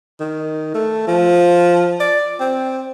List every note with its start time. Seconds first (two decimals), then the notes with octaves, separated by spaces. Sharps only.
0.20 D#3
0.75 A3
1.07 F3
2.00 D5
2.40 C4